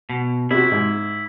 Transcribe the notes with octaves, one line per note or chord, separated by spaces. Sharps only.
B2
C3 E4 F#4
G#2